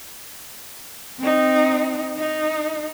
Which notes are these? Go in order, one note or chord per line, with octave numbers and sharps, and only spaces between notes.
C4 D#4
D#4